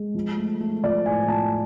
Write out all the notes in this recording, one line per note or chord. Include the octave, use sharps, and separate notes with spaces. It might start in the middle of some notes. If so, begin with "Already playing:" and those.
Already playing: G#3
F3
A3
A3
F3 D5
A2 G#5
F3 A5